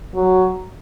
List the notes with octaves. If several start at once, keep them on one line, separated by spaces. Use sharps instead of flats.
F#3